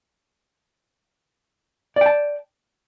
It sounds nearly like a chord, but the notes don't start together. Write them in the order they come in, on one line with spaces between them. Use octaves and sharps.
D5 G5 A5